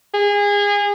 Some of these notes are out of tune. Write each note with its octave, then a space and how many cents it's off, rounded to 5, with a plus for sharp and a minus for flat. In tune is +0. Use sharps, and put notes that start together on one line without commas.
G#4 -25